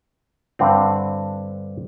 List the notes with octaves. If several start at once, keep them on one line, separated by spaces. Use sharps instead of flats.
G2 D3 C4